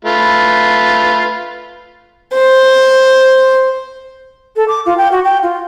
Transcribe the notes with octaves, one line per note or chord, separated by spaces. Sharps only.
A3 F4 B4
C5
A4
D6
F4
G5
F#4
G5
F4